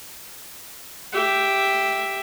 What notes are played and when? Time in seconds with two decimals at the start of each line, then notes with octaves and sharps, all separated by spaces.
1.13 G4 E5